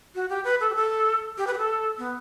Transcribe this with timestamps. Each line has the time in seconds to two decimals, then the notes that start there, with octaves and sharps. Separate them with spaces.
0.15 F#4
0.30 G4
0.45 B4
0.60 A4
0.70 G4
0.75 A4
1.38 G4
1.47 B4
1.53 G4
1.58 A4
1.98 B3